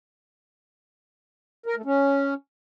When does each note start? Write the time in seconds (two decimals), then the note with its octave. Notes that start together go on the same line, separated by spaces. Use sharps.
1.66 A#4
1.76 A3
1.85 C#4